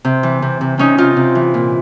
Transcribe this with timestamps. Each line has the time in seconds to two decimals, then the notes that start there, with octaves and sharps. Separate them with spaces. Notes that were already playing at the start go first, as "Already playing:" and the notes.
0.05 C3
0.23 E3
0.42 C3
0.61 C3
0.78 C3 C#4 D#4
0.98 C3 D#4 F4
1.17 C3
1.35 E3
1.54 A#2